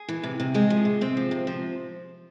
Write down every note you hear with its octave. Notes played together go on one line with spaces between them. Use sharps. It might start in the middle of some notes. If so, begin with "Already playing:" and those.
Already playing: G#4
E3
C3
C3
G#3 C4 G#4
F3
C3
C3 C4
F3
C3
F3